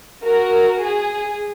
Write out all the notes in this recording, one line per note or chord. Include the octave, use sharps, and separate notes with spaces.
F#4 A#4
G#4